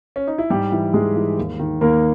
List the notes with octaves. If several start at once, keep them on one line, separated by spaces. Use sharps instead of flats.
C#4
D#4
E4
G#2 G3 G4
E3
G#2 G#3 G#4
E3
D#2
D#3
D#2 A#3 A#4